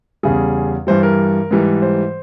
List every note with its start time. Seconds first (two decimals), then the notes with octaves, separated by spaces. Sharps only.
0.23 E2 C#3 G3 G#4
0.87 G2 E3 G3 C5
1.03 A#4
1.51 G#2 E3 G3
1.82 C5